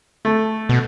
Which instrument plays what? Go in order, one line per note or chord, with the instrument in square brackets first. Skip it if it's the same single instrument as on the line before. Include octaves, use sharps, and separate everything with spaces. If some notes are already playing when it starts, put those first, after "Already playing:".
[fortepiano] A3
[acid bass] B2